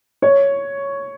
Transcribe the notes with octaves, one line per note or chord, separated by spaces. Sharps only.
C#5